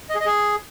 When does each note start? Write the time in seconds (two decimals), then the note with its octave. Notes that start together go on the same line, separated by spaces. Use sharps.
0.09 D#5
0.15 G#4
0.20 D#5
0.26 G#4